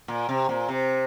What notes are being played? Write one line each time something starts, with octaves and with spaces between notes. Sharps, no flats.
A#2
C3
A#2
C3